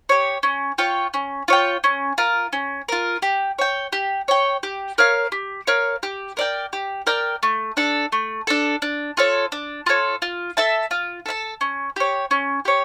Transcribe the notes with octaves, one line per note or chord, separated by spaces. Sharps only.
G4 C#5
C#4
F4 C#5 G5
C#4
F4 C#5 G5
C#4
F4 A#4
C#4
F4 A#4
G4
C#5 G5
G4
C#5 G5
G4
A#4 C#5 F5
G4
A#4 C#5 F5
G4
A#4 D5 G5
G4
A#4 D5 G5
A3
D4 A4
A3
D4 A4
D4
F4 A4 C#5
D4
F4 A4 C#5
F4
A4 E5 A5
F4
A4 E5 A5
C#4
G4 C#5
C#4
G4 C#5